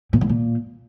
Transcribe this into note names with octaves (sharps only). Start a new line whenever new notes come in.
A#2
G#2
A#2